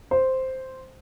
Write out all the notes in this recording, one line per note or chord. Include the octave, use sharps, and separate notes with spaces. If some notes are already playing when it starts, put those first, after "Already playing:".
C5